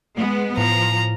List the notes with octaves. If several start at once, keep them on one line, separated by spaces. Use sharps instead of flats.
G#3 B3
A2 F3 A#5